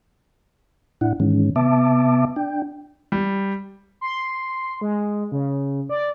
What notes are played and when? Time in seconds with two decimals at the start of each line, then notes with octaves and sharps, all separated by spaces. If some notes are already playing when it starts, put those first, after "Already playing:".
1.01 A2 D4 E4 F#5
1.20 G#2 D#3 E3 G#3 C#4
1.56 C3 B3 E5 A5 D6
2.36 D4 G5
3.12 G3
4.01 C6
4.81 G#3
5.32 C#3
5.89 D5